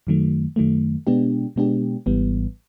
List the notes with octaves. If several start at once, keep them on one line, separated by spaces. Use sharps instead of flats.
F#2 D#3 F#3 A3
F#2 D#3 F#3 A3
B2 G#3 B3 D4 G4
B2 G#3 B3 D4 G4
G#1 G#2 E3 G3 B3